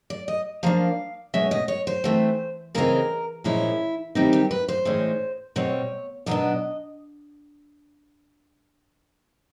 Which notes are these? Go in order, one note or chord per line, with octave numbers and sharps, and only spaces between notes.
D5
D#5
F3 A#3 D4 F5
B2 G#3 C#4 E5
D#5
C#5
C5
E3 A3 C4
C#3 E3 G#3 C4 A#4
A#2 F3 G#3 C#4 E4
D#3 G3 C4 D#4 E4
G4
B4
C5
A2 E3 G#3 C#4
B2 G3 C4 C#5
B2 F#3 B3 D4 D#5